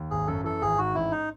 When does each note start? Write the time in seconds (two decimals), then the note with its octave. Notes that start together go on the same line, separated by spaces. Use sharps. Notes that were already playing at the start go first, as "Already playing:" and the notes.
Already playing: D#2
0.11 G#1 G#4
0.27 F#2 A4
0.44 E3 A4
0.61 G#1 G#4
0.78 G#2 F#4
0.94 A1 E4
1.11 D#4